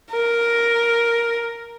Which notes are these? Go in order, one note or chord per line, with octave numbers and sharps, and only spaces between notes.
A#4